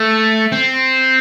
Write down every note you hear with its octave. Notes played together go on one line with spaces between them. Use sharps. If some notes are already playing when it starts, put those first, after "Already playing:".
Already playing: A3
C4